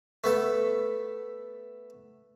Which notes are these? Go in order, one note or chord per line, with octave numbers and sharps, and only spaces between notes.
A3 B3 A4